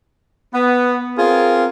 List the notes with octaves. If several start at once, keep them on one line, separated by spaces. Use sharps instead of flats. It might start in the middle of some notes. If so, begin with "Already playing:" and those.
B3
C4 F4 G#4 A#4